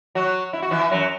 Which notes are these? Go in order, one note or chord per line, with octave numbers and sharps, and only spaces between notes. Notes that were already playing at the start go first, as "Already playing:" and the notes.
F#3 F#4
E4
F#4
E3 E4
F#2 F#3